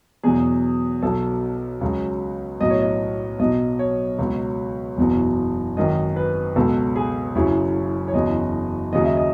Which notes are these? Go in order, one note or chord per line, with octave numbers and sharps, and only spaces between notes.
E2 B2 F#3 G#4
B1 B2 F#3 A4
C#2 C#3 F#3
B1 A2 F#3 D#5
C#5
D#5
B1 B2 F#3 D#5
C#5
C#2 B2 F#3
F#1 E2 B2 F#3
G#1 F#2 D#3 D#5
B4
C#2 B2 F#3 A4
G#4
F#1 F#2 C#3 F#3 E4
C#5
F#1 E2 C#3 F#3 D#5
D#2 C#3 F#3 D#5
E5
D#5